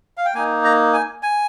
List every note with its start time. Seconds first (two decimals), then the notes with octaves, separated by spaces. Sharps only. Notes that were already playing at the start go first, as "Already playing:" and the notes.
0.17 F5
0.25 G5
0.35 A#3 D#4 G#5
0.64 A#5
0.93 G#5
1.23 G#5